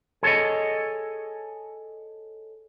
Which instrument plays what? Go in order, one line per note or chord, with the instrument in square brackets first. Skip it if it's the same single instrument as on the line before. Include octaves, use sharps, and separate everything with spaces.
[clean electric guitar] G#4 A4 B4 C#5 D#5